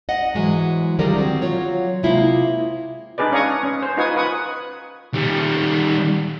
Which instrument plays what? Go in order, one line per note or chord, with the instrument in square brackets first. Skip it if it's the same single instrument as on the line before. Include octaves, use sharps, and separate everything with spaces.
[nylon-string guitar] D#5 F#5
G#2 E3 F#3 G#3
D3 D#3 F3 G3 G#4 A#4
F#3 C4
F#3 F4 C#5
C3 G#3 A#3 E4 F4
[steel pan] D4 D#4 G#4 B4 D5
C#4 C#5 F5 A#5 C#6 D#6
C#4
C5
D#4 F4 B4 G#5 C#6 D#6
B4 F#5 C#6 D#6
[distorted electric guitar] D#3 G3